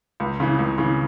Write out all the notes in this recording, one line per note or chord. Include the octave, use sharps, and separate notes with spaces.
C#2
C#3 E3
C#2
C#3 E3